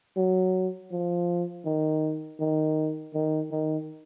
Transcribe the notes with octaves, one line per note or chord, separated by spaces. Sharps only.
F#3
F3
D#3
D#3
D#3
D#3